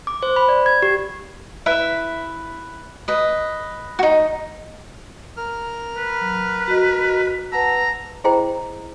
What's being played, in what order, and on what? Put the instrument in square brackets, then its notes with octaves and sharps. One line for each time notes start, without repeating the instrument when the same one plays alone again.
[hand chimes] D6
C5
B5
D5
G#6
G4
[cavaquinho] E4 B4 E5
B4 D#5
D#4 F#4
[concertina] A#4 F6
[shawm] B4
[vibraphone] F#3
F#4 D#5
[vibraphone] B4 F#5 A5 [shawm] A#5 [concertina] E6
[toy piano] E4 G#4 C5 D#5 G5 A#5